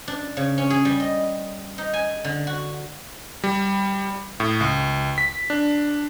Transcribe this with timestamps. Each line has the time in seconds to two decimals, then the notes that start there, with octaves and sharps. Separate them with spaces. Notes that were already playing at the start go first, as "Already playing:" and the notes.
0.08 D4
0.37 C#3
0.58 C#4
0.70 G#4
0.85 G3
1.00 D#5
1.78 D#4
1.94 G#5
2.25 D3
2.47 F#4
3.44 G3
4.40 A2
4.61 C#2
5.18 B6
5.50 D4